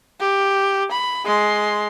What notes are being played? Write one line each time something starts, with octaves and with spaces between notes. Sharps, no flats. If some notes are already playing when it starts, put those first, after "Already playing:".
G4
B5
G#3 C6